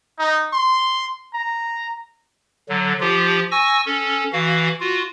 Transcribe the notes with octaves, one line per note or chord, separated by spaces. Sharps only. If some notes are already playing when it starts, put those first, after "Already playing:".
D#4
C6
A#5
D3 F#3
F3 F4 G4
G#5 C#6 E6 A#6
C#4 A4
E3 F#4 F5
F4 F#4